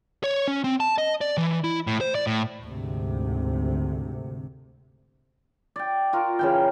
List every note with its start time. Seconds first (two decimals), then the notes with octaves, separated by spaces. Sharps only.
0.24 C#5
0.48 C#4
0.64 C4
0.80 A5
0.98 D#5
1.21 D5
1.37 E3
1.64 E4
1.87 A2
2.01 C5
2.15 D5
2.27 A2
2.62 D2 G#2 C3
5.76 D5 G5
6.13 F4 F#4 A#4
6.39 C#3 E3 G5